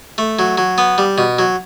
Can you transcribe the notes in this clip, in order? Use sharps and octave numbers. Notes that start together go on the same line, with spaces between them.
A3
F#3
F#3
B3
G3
B2
F#3